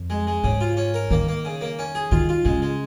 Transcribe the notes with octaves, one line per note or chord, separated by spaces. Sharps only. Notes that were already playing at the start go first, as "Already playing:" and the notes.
Already playing: F2
G#3
G#3
G#2 C#3
F4
C#4
A#4
D#3 A#3
A#3
C#3
A#3
C#4
G#4
D#3 F4
F4
C#3 G#3
G#3